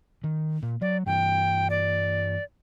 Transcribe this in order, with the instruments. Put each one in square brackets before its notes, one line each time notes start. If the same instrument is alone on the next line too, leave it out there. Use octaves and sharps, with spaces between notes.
[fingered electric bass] D#3
A#2
[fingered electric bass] F#3 [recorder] D5
[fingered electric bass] G2 E3 [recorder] G5
[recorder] D5